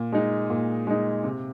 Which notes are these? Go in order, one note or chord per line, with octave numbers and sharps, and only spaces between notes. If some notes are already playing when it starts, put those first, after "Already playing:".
Already playing: A#2
G#3 D#4
A#2
G#3 D#4
C3